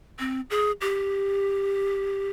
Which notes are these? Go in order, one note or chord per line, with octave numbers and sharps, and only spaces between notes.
C4
G#4
G4